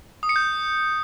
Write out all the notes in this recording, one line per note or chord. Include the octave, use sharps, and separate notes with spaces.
D#6
C#7
G6